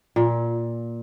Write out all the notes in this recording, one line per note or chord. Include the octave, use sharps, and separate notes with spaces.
A#2